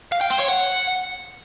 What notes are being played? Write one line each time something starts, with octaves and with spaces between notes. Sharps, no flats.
F5
G5
C5
C#5
F#5